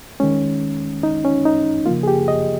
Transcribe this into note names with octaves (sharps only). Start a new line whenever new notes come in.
D#3 G#3 C#4
D#4
C#4
D#4
C#3 F3 A#3 F4
G#4
G4
D#5